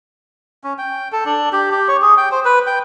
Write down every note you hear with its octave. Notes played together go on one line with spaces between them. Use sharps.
C#4
G5
A4
D4
G4
G4
C#5
G#4
G5
C5
B4
G5